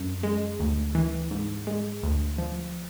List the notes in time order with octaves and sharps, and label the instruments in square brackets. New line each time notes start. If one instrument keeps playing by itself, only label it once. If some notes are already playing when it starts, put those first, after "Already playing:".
Already playing: [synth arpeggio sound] F#2
G#3
D2
E3
G#2
G#3
D2
F3